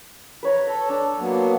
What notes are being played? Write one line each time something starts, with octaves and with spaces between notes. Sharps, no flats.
B4 C#5 A#5
A4 A#5
D4
F#3 A#3 B3